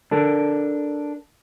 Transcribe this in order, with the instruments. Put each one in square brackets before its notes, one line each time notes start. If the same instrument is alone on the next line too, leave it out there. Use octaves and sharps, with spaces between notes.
[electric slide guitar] D4 A4 A#4